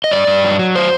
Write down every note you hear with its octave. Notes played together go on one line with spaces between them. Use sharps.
D#5
G2 D5
G2
F#3
F#3
C5